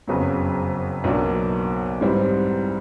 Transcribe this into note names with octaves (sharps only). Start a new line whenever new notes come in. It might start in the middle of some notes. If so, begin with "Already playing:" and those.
F#1 F2 C#3 F#3 B3
B1 B2 F#3 A#3 D4
G#2 E3 G3 C4